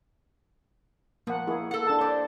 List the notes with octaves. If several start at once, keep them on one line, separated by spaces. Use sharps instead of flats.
F3 A#3 F#5
A#3 E4 G#4
A4 F#5
D4 A5
C5 D5